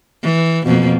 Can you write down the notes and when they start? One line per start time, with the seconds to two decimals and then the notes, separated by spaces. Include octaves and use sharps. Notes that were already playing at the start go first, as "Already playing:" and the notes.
0.23 E3
0.66 F2 B2 A#3